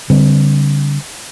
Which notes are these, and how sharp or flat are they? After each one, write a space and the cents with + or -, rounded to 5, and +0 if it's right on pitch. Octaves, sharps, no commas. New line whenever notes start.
D3 -35 G3 +0 C4 -20